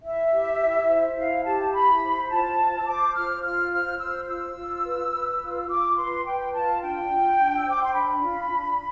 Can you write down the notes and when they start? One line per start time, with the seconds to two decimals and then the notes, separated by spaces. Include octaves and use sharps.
0.03 E4 E5
0.32 G4
0.60 E4
0.88 C5
1.17 E4 F5
1.44 G4 A5
1.73 E4 B5
2.01 C5
2.29 F4 A5
2.58 C5
2.79 E6
2.86 C5 D6
3.14 F4 F6
3.42 F4 F6
3.71 C5 F6
3.99 C5 E6
4.23 F6
4.27 F4 E6
4.56 F4
4.84 B4
5.12 B4
5.40 F4
5.68 F4 D6
5.96 B4 C6
6.25 B4 G5
6.53 F4 A5
6.81 D4 G5
7.10 F4
7.38 D4
7.56 E6
7.66 C5 D6
7.82 C6
7.94 D4 B5
8.22 F4
8.51 D4